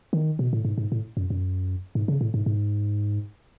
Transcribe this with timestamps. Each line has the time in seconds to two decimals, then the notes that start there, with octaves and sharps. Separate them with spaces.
0.13 D#3
0.39 B2
0.53 A2
0.65 G#2
0.78 G#2
0.92 A2
1.17 F#2
1.30 F#2
1.95 G#2
2.08 C#3
2.21 A2
2.34 G#2
2.46 G#2